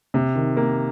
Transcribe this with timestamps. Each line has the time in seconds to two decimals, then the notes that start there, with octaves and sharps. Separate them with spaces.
0.14 C3
0.35 D#3
0.57 A#3